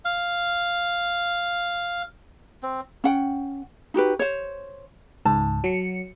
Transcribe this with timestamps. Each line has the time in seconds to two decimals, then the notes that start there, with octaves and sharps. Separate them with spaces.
0.05 F5
2.63 C4
3.04 C#4 F#5 G5
3.94 D#4 F#4 G4 B4
4.19 C5 C#5
5.25 C#2 G#2 A5
5.64 F#3 C#7